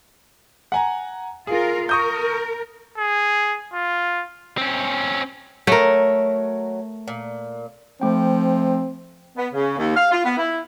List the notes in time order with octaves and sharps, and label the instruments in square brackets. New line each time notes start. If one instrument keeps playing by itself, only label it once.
[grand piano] F#5 G#5 A#5
[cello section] F4 A#4 [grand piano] G#4
[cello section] A#4 [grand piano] C#6 D#6 G6
[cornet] G#4
F4
[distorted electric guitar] C4 C#4
[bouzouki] F#3 [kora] A3 A#4
[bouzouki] A#2
[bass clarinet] F3 [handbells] A3 G5 [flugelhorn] C4
[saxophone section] B3
C#3
D#2
F5
F4
B3
E4